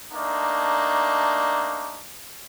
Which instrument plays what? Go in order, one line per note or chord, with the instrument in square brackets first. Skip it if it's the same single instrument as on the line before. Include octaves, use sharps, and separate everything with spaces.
[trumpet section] A3 A#3 D4 D#4